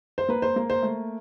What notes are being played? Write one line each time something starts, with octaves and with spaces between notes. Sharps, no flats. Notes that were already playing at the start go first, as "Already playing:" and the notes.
C5
A#3 B4
C5
A#3
C5
A3